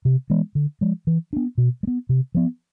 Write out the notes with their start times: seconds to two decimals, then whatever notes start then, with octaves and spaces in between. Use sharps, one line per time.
0.05 C3
0.30 E3 G#3 B3
0.55 D3
0.81 F3 G#3
1.07 E3
1.33 B3 D4
1.58 B2
1.83 G#3
1.87 B3
2.09 C3
2.35 F3 B3